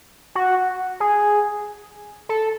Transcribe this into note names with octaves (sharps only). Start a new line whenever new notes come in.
F#4
G#4
A4